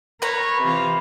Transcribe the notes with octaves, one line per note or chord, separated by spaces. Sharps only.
A#4 B4 C#5 A#5
C3 E3 F4